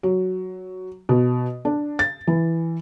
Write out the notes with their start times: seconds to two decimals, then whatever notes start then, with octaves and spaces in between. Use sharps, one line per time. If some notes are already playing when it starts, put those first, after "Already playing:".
0.03 F#3
1.09 B2
1.65 D4
1.99 A6
2.27 E3